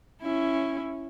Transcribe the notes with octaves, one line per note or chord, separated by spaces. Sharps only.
C#4 E4